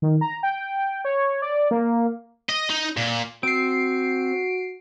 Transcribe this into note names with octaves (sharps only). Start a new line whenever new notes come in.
D#3
A#5
G5
C#5
D5
A#3
D#5
D#4
A#2
C4 F#4 C7 D7